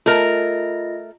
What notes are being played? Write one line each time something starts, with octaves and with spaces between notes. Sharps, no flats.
A3 F4 A#4 D#5 A#6